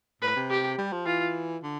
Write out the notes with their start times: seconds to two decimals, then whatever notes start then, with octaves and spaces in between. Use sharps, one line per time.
0.22 A2 B4
0.36 C3
0.50 G4
0.78 G3
0.92 F3
1.06 E3 F4
1.63 D3